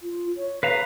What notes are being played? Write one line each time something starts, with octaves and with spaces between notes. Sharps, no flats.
F4
C#5
B4 C#5 F5 A#5